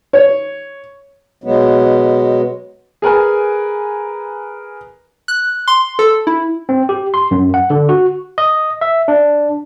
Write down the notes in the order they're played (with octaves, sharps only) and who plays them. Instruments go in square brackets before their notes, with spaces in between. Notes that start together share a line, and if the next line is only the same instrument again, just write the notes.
[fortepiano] C#5
[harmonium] B2 F#3 G#3 B3
[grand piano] G#4 A#4 B4 G#5
[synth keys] F#6
C6
A4
E4
[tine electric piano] C4
G4
C6
F#2
F#5
D3
F#4
D#5
E5
D4